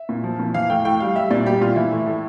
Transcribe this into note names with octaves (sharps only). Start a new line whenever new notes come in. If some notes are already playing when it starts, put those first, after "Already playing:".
Already playing: E5
A#2
F3
A#2
E3 F5
A2 G5
A2 G5
G3 F5
G3 E5
A#2 D5
G3 G4
A#2 F4
E3 E4
A2
A2